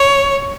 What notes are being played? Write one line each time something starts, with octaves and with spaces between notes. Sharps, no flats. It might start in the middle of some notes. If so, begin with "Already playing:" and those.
Already playing: C#5